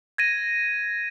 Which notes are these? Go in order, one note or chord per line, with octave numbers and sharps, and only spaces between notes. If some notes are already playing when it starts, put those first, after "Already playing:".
G#6 A#6 D#7